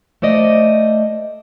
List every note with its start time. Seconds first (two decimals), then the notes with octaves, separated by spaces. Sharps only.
0.22 A3 C5 D5 D#5